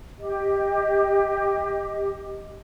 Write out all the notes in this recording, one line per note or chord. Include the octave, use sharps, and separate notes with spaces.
G4 D#5